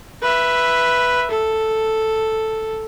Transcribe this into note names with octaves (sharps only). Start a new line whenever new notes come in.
B4 E5
A4